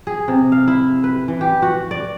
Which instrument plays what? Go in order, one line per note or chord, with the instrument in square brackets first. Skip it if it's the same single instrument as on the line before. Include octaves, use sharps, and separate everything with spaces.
[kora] G#4
C3
F5
E4
B4
E3
G4
F#4
D5